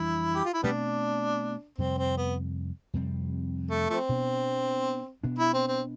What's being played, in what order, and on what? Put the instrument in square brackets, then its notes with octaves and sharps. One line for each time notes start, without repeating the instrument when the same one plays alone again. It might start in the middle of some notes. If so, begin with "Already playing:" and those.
Already playing: [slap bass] F2 E3 G3 D4 [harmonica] E4
[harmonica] G4
F4
E4
[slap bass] B2 A3 C4 [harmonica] G3 B3 D4
[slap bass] F2 C3 G3 [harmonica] C4
[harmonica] C4
B3
[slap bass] F2 C3 G3 C4
[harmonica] A3
F3 A3 C4
[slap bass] B2 B3 D4
B2 B3 D4
[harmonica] E4
C4
C4